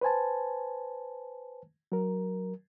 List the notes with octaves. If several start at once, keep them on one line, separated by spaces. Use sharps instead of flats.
B4 C5 G#5 A5
F#3 A#4